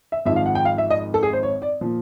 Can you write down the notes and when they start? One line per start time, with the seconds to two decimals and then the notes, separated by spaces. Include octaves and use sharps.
0.12 E5
0.25 G#1 G#2 F3 E5
0.36 F5
0.46 F#5
0.55 G5
0.65 F5
0.78 E5
0.90 D#5
1.14 A4
1.23 G#4
1.33 C5
1.43 C#5
1.62 D5
1.81 A#2 F3